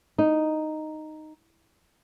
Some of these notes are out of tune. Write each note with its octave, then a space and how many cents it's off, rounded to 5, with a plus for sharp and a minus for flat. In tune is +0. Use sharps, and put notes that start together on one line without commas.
D#4 -5